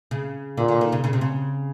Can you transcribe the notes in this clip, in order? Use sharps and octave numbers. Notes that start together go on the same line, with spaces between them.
C#3
A#2 D3
D3
D#3
C#3
C#3
C3
C#3